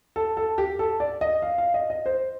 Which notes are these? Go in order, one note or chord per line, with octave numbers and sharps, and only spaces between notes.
A4
A4
G4
A4
D5
D#5
F5
F5
D#5
D#5
C5